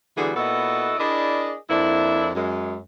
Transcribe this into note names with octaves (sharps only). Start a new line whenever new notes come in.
D3 E3 G3 B3 F#4 G#4
A#2 B3 E4 F#4 A4 D#5
D4 E4 G#4 A#4 D5 D#5
F2 A#3 D4 E4
F#2 G#3